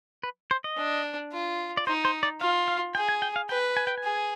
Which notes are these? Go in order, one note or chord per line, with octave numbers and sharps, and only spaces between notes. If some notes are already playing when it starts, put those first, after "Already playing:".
B4
C5
D#5
D4
F4
D5
D#4 C5
C5
D5
F4 F5
F5
G#4 G5
G#5
G5
F5
B4 G5
G#5
G5
G#5
G#4